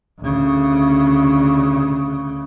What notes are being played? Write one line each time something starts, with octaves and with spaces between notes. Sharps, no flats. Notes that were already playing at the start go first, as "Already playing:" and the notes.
D2 C#3